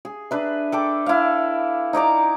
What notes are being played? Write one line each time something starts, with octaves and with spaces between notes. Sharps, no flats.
G#4
D4 B4 E5
A4 G5 D6
E4 F5
D#4 E4 D5 A#5